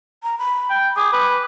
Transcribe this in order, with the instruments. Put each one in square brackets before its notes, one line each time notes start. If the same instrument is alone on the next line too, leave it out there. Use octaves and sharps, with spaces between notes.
[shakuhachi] A#5
B5
[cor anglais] G5
[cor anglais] G#4 [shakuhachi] D6
[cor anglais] B4